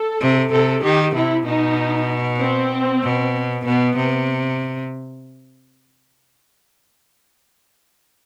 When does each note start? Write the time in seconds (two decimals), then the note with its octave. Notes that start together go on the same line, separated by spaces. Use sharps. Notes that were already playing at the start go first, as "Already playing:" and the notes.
Already playing: A4
0.21 C3
0.52 C3 A4
0.83 D#3 G4
1.15 C3 E4
1.46 B2 D#4
2.41 C4
3.03 B2
3.65 B2 B3
3.96 C3